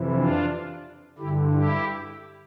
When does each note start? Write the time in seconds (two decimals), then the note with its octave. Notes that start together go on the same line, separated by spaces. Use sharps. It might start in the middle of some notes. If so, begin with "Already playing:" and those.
Already playing: F2 C3 E3
0.14 D4 F4
1.18 G2 D3 E4 G4
1.53 E4 G4